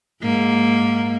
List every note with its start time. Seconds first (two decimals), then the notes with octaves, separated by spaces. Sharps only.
0.22 G#2 A#3